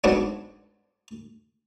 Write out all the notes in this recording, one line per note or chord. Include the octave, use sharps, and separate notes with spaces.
G#2 F#3 B3 C4 D4